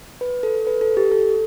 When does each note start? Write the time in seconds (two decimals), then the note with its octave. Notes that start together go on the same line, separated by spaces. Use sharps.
0.21 B4
0.43 A4
0.67 B4
0.81 A4
0.97 G4
1.12 A4